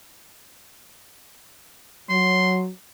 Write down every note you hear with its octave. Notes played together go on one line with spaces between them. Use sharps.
F#3 C6